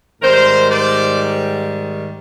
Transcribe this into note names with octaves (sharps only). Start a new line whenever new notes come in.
G#2 D#3 G3 A#4 C5
C5 D5